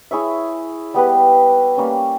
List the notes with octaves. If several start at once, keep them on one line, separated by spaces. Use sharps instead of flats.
E4 G#4 C#5 E5
G3 B3 G4 B4
G3 A#3 C#4